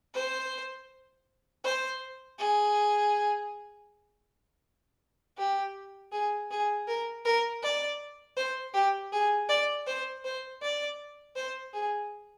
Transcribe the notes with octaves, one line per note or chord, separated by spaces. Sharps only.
C5
C5
G#4
G4
G#4
G#4
A#4
A#4
D5
C5
G4
G#4
D5
C5
C5
D5
C5
G#4